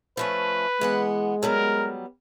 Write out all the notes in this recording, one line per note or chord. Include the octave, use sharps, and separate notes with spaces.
F3 A3 C#4 B4
E3 G#3 B3 F#5
F#3 G3 B3 A#4